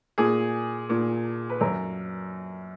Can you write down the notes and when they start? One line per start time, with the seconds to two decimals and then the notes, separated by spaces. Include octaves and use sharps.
0.18 A#2 G#4
0.89 A#2
1.49 B4
1.61 F#2 A#4